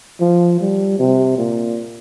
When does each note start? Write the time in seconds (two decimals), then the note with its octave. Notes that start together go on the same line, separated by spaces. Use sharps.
0.20 F3
0.61 G3
1.00 C3
1.38 A#2